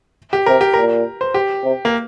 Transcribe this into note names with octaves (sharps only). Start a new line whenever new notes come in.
G4
C3 A#4
G4
A#2 A#4
C5
G4
C3
A#3